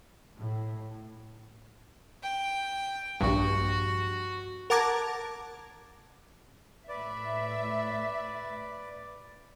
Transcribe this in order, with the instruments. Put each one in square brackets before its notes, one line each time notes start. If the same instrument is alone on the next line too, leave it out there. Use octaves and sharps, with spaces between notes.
[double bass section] A2
[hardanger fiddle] G5
[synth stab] A#1 G2 [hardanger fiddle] F#4
[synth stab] A#4 F#5 A5 A#5 D6 G#6
[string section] A2 E5 [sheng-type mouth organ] B4 D5